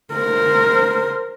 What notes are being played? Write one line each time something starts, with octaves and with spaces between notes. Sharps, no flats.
A#4 C5